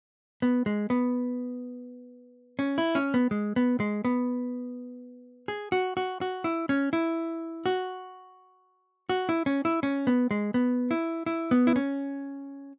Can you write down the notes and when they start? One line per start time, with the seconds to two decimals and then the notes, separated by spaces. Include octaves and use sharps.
0.42 B3
0.66 G#3
0.90 B3
2.59 C#4
2.78 E4
2.95 C#4
3.14 B3
3.31 G#3
3.56 B3
3.80 G#3
4.05 B3
5.48 G#4
5.72 F#4
5.97 F#4
6.21 F#4
6.44 E4
6.69 C#4
6.93 E4
7.66 F#4
9.09 F#4
9.29 E4
9.46 C#4
9.65 E4
9.83 C#4
10.07 B3
10.31 G#3
10.54 B3
10.91 E4
11.26 E4
11.51 B3
11.67 E4
11.76 C#4